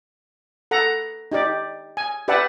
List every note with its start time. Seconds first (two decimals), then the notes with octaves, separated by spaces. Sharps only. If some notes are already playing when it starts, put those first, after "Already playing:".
0.71 A4 F#5 A#5
1.32 D#4 G4 D5
1.97 G#5
2.28 G4 B4 D5 E5 F#5 A5